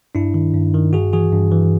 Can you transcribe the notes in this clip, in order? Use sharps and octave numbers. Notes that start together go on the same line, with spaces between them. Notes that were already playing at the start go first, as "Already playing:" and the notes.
G2 D4 E4
D#3
G2
D#3
G2 F#4 G#4
E3 F#4 G#4
G2
E3